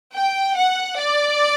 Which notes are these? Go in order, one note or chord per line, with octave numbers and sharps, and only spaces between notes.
G5
F#5
D5